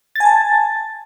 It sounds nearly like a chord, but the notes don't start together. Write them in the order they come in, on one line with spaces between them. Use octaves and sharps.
A6 G#5 A5